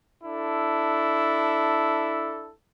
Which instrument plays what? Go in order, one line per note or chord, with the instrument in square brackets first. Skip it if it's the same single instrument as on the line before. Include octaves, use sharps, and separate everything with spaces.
[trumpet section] D4 E4 A4